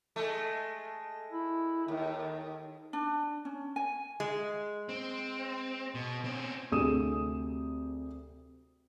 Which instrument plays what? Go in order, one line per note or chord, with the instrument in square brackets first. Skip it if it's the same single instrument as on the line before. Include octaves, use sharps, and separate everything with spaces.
[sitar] G#3 A3
[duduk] E4
[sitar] D#2 [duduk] D#3
[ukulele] D4
C#4
G#5
[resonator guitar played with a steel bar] G#3
[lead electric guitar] C4
B2
C4 C#4
[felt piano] D2 C3 G#4 D#6 D#7 E7